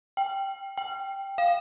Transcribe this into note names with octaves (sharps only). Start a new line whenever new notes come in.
G5
G5
F5